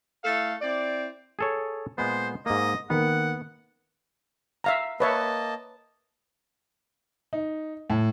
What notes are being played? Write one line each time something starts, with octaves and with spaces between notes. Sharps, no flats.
A3 E4 A4 F5
C4 E4 D5
G#4 A4 C#5
A#2 G#3 B3 C5
G#2 A#3 D#5
D#3 A#3 B3 F#5
E5 F5 A#5
A#3 B4 C#5 D#5 E5 A5
D#4
A2